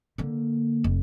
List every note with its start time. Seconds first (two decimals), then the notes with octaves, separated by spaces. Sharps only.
0.18 D3 A#3
0.84 F1